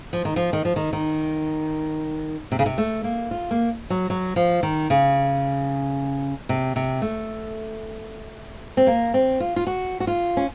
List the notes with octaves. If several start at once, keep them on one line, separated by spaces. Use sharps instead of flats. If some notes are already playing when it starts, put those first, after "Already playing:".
F3
D#3
F3
D#3
F3
D#3
D#3
C3
C#3
C3
A3
A#3
F4
A#3
F#3
F#3
F3
D#3
C#3
C3
C3
A3
C4
A#3
C4
F4
F4
F#4
F#4
F4
C#4